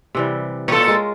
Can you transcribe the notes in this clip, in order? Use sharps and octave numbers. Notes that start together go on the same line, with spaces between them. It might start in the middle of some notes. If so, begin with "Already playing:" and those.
C3 E3 G3
A#2 F4 A4 C#5
G#3 A#4